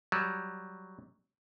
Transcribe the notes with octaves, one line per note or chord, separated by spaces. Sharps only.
F#3 G3